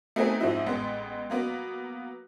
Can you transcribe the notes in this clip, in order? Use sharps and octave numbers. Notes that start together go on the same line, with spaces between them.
A3 B3 C4 D#4 G#4 A#4
G#2 F3 C4 D#4 E4
A1 G#3 B3
F#3 A#3 B3